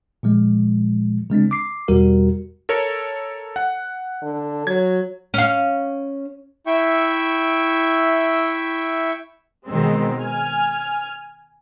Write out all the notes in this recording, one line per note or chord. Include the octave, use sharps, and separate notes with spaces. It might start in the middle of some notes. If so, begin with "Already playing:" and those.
A#2 F3 G#3
C#3 G#3 C4 D4
D6 C7
E2 B2 G3 F#4 A#4
A4 A#4 C#5
F#5
D3
F#3 G#6
C#4 F5
E4 E5 G5 C#6
B2 D#3 G#3 C4
G#5 F6